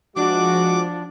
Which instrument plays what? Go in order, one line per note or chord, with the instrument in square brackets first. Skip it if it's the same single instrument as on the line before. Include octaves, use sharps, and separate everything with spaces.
[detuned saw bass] F3 [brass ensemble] G#3 F#4 [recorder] D4 [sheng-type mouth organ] D6